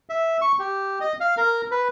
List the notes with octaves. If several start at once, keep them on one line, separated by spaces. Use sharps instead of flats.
E5
C#6
G4
D#5
F5
A#4
B4